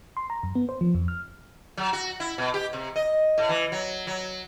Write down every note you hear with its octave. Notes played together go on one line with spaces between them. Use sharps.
C6
A#5
F#2
B3
C5
F3
F2
F6
F#3
F#4
E4
B2
G4
C3
D#5
A2
E3
F#3
F#3